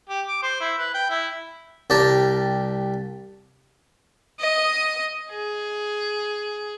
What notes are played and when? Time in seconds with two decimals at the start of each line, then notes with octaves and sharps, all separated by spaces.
0.09 G4
0.27 D6
0.43 C5
0.60 E4
0.78 B4
0.94 G5
1.09 E4
1.90 C2 G3 D5 G5 A5 A#5
4.39 D#5 D#6
5.30 G#4